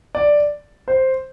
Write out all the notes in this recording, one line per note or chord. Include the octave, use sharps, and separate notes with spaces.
D5
C5